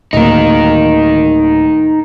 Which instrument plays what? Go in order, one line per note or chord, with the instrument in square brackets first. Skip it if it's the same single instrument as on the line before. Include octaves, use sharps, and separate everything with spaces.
[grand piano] D1 A#3 [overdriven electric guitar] D#4 A#4